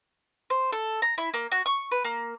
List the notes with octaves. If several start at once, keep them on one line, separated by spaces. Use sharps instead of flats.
C5
A4
A#5
E4
A#3
F#4
C#6
B4
A#3